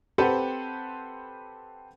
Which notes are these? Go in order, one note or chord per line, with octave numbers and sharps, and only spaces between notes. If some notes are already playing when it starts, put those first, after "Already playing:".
C4 G4 A4 B4 C5 F#5